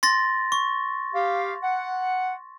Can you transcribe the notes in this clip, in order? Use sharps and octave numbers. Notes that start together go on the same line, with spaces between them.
C6 A6 A#6
C#6
G4 F5
F#5